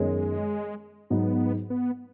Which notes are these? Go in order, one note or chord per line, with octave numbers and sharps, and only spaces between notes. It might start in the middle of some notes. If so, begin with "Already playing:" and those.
Already playing: F#2 D#3 G#3 B3 G#4
G#2 F#3 B3 D#4
B3